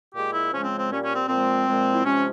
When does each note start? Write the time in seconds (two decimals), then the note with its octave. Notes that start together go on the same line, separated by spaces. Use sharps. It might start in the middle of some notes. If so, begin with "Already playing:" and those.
0.14 A#2 G#3 G4
0.33 E4
0.52 C#3 F3 G#3 C#4
0.64 C4
0.77 C4
0.90 A#2 G3 C#4
1.03 C#4
1.15 C4
1.27 A#2 F3 G#3 C4
1.67 A#2 F3 G#3
1.93 E4
2.03 C3 F3 G#3 C#4